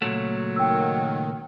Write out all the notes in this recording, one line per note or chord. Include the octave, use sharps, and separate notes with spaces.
C#2 A#2 F#3 A3
D#3 G5 E6